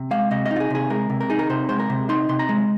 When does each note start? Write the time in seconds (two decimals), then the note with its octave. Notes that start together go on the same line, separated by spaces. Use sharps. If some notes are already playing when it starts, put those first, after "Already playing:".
Already playing: C3
0.11 G#3 F5
0.31 C3 D#5
0.46 D#5
0.51 D#4
0.56 F4
0.60 G#4
0.70 C3 G#4
0.90 G#3 A#4
1.10 C3
1.20 A#4
1.30 D#4 G#4
1.39 A#4
1.50 C3 C5
1.69 G#3 C5
1.79 A#4
1.90 C3
2.09 D#4 C6
2.29 C3 C6
2.39 A#5
2.49 G#3